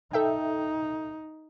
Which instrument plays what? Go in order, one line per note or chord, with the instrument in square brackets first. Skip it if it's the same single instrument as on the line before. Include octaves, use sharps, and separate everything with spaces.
[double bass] D#4 [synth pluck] A4 E5 G5